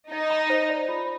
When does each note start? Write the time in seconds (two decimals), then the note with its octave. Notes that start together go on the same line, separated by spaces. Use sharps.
0.11 D#4 D#5
0.30 A#5
0.50 C5
0.70 D5
0.89 F4